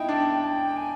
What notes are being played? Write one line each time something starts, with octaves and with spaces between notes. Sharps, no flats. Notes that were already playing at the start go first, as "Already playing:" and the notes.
Already playing: D#4 E4 G5
D4
A5
G5
G#5